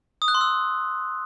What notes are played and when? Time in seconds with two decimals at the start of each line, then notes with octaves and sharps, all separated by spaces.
0.22 D#6
0.28 F#6
0.35 C6
0.41 E6